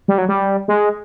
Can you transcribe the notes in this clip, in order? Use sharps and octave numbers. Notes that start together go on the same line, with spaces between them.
G3
F#3
G3
G#3